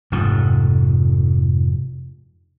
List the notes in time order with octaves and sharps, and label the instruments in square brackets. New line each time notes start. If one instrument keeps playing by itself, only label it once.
[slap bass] F1 G#2 F3